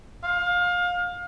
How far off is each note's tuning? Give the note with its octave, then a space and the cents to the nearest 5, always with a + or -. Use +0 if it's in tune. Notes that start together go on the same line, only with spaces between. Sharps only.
F5 +25